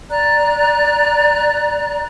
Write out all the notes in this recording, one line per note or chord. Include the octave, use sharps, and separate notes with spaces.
D5 A#5 F#6